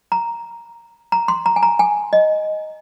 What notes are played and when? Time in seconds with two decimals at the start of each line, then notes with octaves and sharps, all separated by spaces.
0.12 A#5
1.12 A#5
1.28 C6
1.46 A#5
1.56 G#5
1.63 A#5
1.79 G#5
2.13 D#5